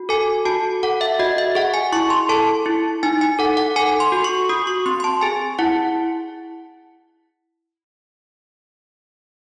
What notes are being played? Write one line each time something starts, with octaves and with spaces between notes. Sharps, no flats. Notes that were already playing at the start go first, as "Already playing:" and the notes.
Already playing: F#4
A4 G#5
F#4 A5
A4 F#5
E5
F#4 D#5
E5
G#4 F#5
G#5
E4 C#6
C6
A4 A5
E4
D#4 G#5
G#5
A4 F#5
F#5
A4 G#5
C6
F#4
C#6
F#4 D#6
C#6
C4 C6
C6
A5
G#4 G#5
E4 F#5